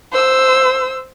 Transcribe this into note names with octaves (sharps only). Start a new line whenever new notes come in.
C5 E6